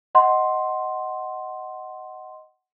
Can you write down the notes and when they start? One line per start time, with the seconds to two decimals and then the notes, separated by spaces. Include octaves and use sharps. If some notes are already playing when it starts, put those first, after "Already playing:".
0.15 D#5 F#5 C6